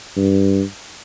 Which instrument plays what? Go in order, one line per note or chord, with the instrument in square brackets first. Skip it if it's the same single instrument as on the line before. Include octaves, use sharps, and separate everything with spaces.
[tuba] G2